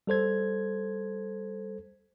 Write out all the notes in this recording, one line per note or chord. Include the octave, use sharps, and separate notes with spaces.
G3 A4 C5 G#6